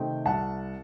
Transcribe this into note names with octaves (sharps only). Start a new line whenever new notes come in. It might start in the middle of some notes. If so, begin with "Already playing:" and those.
Already playing: C3 D#3 A3 C4 D#5 G5
C2 F#5 A5